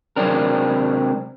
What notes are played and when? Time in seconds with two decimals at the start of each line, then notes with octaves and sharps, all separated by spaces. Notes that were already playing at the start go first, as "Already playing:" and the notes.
0.16 C3 F#3 G#3 C4 D4 A#4